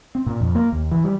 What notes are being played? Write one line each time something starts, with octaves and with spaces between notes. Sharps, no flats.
C4
A#2
F2
A#3
D#2
E3
G3